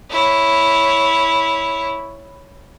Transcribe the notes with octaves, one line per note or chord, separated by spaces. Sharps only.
E4 C#5